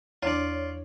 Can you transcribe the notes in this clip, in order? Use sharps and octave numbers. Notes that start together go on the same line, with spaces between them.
E2 D4 F4 C#5 D5